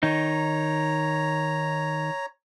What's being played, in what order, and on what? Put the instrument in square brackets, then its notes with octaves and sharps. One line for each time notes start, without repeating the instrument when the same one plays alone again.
[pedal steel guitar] D#3 D#4 [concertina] C#5 A#5